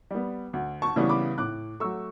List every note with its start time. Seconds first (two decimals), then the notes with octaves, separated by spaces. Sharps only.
0.11 G3 B3
0.53 D2
0.82 A5 C#6
0.96 C#3 E3 G3 B3
1.09 B5 D6
1.38 A2 D6 F#6
1.80 F#3 A3 C#6 E6